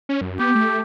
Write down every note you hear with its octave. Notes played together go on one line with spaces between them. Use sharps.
C#4
F#2
B3 G4
A3